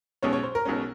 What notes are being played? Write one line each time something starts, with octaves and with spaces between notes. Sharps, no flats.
B1 B2 G#3 C#4 C#5
C#5
C5
A#4
B1 B2 G#3 C#4